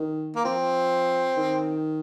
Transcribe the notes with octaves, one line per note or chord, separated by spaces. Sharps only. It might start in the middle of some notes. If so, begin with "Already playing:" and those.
Already playing: D#3
A#3
F3 C4
D#3